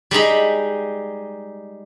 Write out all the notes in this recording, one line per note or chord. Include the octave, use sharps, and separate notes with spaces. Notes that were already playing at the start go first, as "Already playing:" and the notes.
G3 G#3 D#4 B5